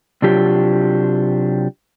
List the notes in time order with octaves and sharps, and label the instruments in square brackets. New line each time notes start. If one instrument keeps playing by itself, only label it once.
[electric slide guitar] C3 F#3 D4 F4 G4